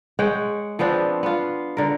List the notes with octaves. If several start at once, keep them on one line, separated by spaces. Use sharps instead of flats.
G#3 C#5 F#5 G5
F3 B3 C4 D4
B3 F4
D3 A#4